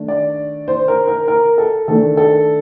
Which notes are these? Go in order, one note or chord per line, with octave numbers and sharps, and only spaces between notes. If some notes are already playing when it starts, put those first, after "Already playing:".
Already playing: D#3 A3 D4
D5
C5
A#4
A#4
A#4
A4
D#3 A3 D4 A4
A4